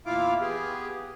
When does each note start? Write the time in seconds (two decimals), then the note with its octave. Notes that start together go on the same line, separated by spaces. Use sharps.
0.06 E2 A#2 E4 F4 F5 D6
0.41 B3 G4 G#4